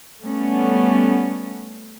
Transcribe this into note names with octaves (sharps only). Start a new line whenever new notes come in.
G3 A3 B3 C#4